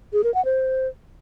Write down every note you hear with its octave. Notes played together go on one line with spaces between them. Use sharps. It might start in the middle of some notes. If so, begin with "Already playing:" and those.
G#4
A#4
F#5
C5